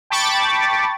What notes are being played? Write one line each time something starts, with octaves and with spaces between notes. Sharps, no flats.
G5 A5 B5 C#6 D6 A6